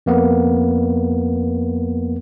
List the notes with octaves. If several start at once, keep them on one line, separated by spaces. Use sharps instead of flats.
F2 A#3 B3